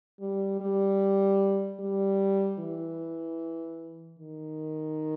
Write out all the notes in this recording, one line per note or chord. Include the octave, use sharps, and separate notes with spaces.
G3
G3
G3
E3
D#3